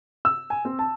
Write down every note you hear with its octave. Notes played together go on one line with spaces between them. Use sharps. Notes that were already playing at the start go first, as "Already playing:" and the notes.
E6
G#5
C4
A5